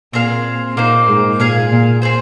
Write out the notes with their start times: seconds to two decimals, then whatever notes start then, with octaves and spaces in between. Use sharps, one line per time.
0.13 A#2 C4 G#4 F5
0.77 A#2 A#3 D#4 C5
1.08 G#2
1.39 A#2 G#4 F5 G#5
1.71 A#2
2.02 C4 G#4 C5